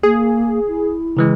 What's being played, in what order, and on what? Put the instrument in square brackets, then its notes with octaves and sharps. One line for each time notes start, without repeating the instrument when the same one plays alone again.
[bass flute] A#3 [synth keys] G#4
[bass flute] E4
[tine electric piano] C#3 E3 G#3